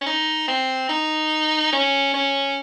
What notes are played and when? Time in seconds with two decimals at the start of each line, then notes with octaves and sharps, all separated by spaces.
0.01 C#4
0.06 D#4
0.48 C4
0.89 D#4
1.73 C#4
2.14 C#4